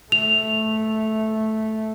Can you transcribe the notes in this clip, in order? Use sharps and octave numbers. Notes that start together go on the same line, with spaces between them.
A3 F7